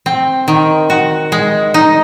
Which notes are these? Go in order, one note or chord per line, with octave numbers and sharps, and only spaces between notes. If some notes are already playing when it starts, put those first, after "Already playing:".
C4
D#3
F#4
G#3
D#4